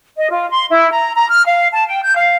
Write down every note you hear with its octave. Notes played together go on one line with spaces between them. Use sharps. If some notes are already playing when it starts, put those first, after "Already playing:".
D#5
F4
C6
E4
A#5
A#5
F6
F5
A5
G5
G6
F5